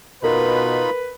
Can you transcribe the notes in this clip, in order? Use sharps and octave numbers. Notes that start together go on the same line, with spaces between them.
B2 D#4 F4 A#4 B4 B5